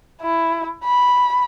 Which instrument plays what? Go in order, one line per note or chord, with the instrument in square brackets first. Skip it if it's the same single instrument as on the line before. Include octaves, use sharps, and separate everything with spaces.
[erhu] E4
B5